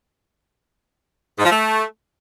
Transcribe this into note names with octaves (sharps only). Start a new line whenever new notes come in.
G#2
F3
A3